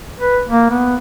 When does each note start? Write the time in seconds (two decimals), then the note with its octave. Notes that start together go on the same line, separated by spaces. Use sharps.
0.19 B4
0.49 A#3
0.71 B3